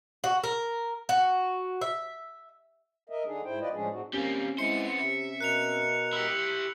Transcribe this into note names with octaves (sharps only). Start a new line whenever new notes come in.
F#4
A#4
F#4
E5
A#4 D#5 E5
D3 D4 D#4 G#4
G#2 E4 C5 G5
F4 B4 D5 D#5
A2 F3 G#3 C#4 D4 G#4
A2 C4 D#4 F#4
G3 A#3 C4 C#4
G#3 B3 E4 C5 C#7
C3 E5
B2 A#4 F#6 C#7 F7
E4 G4 E6